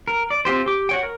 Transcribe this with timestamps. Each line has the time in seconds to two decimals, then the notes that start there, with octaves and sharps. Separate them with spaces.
0.08 A#4
0.31 D5
0.45 C4 F4 G4 C5
0.66 G4 D6
0.89 F#4 C#5 G5
1.03 A#4